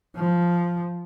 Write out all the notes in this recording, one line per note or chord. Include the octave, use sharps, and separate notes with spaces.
F3